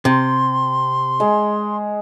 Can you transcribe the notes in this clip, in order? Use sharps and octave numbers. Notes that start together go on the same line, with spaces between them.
C3 C6
G#3